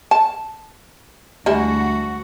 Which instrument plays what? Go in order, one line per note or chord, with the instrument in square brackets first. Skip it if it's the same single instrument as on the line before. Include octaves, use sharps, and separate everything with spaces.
[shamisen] A5
[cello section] D2 F#4 [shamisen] G3 G#3 E4